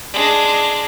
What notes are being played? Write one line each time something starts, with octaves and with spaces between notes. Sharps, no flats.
G#3 D4